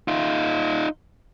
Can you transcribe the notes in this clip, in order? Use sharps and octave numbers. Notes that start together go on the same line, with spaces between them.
D#4 F4